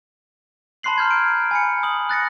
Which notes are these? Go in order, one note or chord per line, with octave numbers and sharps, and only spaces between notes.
A5 B5 C6 F#6 C7 F#7
A#5 F6 G6 G#6
D7
G#5 B5 C#7
D#6 F#7
F#6 A6 A#6 C#7